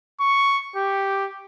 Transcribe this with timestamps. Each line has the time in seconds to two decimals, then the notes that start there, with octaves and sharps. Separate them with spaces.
0.20 C#6
0.76 G4